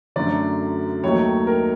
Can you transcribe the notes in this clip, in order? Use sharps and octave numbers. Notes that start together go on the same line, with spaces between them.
F#2 D3 F#3 A3 D5
D#2 D#3 F#3 A3 C#5
A#4